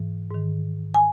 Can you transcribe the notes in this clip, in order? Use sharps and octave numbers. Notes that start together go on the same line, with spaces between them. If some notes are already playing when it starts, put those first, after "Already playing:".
Already playing: G#2 E3
G#2 D#3
G#5